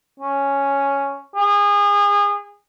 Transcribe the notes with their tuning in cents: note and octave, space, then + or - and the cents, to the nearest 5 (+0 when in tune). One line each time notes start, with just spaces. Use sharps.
C#4 +0
G#4 -30